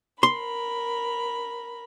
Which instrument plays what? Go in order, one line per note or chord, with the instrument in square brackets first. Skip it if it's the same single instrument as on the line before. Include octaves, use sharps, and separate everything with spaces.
[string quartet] A#4 B5 [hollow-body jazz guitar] C6